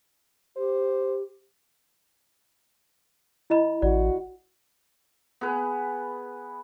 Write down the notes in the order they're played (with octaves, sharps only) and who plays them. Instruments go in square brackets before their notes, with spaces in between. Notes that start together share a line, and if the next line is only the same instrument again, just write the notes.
[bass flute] G4 [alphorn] C5
[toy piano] E4 D#5 B5
[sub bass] A1 [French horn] F#4 [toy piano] D5
[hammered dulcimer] B3 G#4 B4